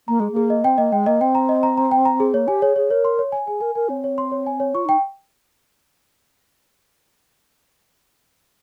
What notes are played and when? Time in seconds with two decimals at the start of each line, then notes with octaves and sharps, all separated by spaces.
0.08 A#3 A#5
0.20 G#3 G#4
0.32 A#3 G#4
0.50 D#5
0.64 C4 G5
0.78 A#3 D#5
0.92 G#3 G5
1.06 A#3 D#5
1.21 C4 G5
1.35 A#5
1.49 D#5
1.63 A#5
1.77 A#5
1.91 G5
2.05 A#5
2.20 G#4
2.34 A#3 C#5
2.48 G4 G#5
2.62 G#4 C#5
2.76 G#4 C#5
2.90 A#4 C#5
3.05 C6
3.19 C#5
3.32 G#5
3.47 G#4 G#5
3.61 A#4 G#5
3.75 A#4 G#5
3.89 C4 C#5
4.04 C#5
4.18 C6
4.32 C#5
4.46 G#5
4.60 C#5
4.74 F4 C#6
4.85 D#4 G5